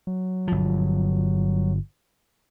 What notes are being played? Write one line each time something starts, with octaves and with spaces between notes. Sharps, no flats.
F#3
G1 F3